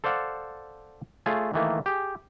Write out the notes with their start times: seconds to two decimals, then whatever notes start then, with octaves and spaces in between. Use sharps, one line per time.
0.04 A4 C5 D5 F5 F#5
1.26 A3 F4 G#4 C#5
1.54 D#3 E3 A3 A#3
1.86 G4 G#4